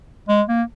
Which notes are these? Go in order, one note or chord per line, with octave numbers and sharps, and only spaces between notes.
G#3
A#3